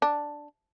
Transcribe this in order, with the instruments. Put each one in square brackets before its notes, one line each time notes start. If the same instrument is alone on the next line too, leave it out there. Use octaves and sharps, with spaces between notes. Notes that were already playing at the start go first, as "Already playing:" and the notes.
[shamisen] D4